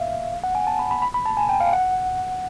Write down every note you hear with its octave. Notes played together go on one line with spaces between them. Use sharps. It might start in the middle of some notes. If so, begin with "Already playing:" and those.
Already playing: E5 F5
F5
F#5
G#5
A5
B5
B5
B5
B5
A5
G#5
G5
F5
F#5